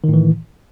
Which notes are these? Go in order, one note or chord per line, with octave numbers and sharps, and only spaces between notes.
A2 D#3 E3